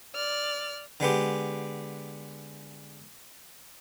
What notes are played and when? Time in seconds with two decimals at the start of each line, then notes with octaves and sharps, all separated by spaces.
0.15 D5 F6
1.00 D3 G#3 B3 G4